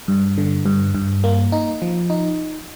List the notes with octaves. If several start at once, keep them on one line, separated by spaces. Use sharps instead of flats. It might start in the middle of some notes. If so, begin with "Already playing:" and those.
G2
D3
G2
G2
A#3
D#4
F3
D#4